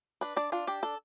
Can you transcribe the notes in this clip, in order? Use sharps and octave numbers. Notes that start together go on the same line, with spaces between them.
D4 B4
D4 D5
D4 F4
D4 G4
D4 A4